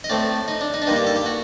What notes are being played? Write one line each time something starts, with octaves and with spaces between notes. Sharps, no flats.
D#5
A2 A3 C4 D5
D#4
D4
D#4
D4
G2 D#3 G3 A#3 D#4
G4
A4
G4
F#4